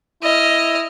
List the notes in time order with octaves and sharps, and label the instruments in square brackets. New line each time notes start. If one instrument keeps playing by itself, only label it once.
[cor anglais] E4 [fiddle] D#5 F6